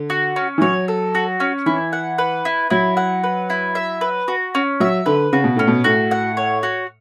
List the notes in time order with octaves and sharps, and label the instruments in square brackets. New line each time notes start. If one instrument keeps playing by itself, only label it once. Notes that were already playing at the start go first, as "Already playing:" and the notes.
Already playing: [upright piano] D3
[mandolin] F#4
C#4
[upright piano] E3
[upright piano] F#3 [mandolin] C#5
[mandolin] A4
F#4
C#4
[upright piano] E3 [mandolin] E4
[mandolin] F#5
B4
E4
[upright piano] F#3 [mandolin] E4
[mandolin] F#5
B4
E4
E5
B4
F#4
C#4
[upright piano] F#3 [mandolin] E5
[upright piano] D3 [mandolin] B4
[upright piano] C#3 [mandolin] F#4
[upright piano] B2
[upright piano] A2 [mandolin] C#4
[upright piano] B2
[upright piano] A2 [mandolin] F#4
[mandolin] F#5
C#5
F#4